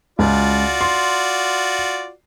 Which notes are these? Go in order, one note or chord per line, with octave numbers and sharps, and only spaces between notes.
C#2 F4 F#4 D5
C6